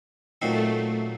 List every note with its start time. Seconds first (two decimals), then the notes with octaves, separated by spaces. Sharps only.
0.42 A#2 F#3 A3 C4 D#4